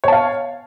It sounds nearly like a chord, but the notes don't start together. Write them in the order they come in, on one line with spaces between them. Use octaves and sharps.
C#5 A5 F5